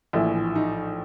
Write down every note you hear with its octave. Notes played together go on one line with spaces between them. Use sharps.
A#1 A2 E3 E4
D#4